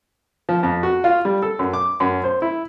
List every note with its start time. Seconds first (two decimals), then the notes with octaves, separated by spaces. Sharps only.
0.49 F3
0.63 F2
0.83 F#4
1.04 F4
1.25 G3
1.43 A4
1.59 F#2
1.73 D6
2.00 F#2
2.24 C5
2.42 E4